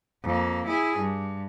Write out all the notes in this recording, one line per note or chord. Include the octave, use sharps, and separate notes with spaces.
F2 A#3
E4 G#4
G2